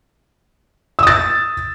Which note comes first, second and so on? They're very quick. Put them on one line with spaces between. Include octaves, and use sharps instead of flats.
E6 D#6 A6